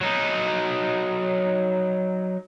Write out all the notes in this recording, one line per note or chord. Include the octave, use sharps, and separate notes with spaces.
F#3 D#4